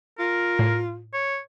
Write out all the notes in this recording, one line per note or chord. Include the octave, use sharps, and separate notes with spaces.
F4 A#4
A2
C#5